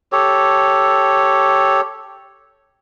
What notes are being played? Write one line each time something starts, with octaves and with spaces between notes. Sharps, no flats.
G4 A4 C#5